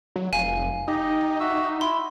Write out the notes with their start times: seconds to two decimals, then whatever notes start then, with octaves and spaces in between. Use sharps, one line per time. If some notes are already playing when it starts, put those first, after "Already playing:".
0.16 F#3
0.33 F1 F5 G#5
0.88 D#4 G4 D#5
1.40 F#4 E5 E6
1.81 E4 C6